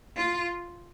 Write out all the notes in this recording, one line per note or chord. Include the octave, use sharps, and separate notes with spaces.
F4